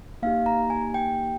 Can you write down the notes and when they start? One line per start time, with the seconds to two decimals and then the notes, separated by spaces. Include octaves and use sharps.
0.22 A#3 D#4 G4 F5
0.46 A#5
0.70 G#5
0.94 G5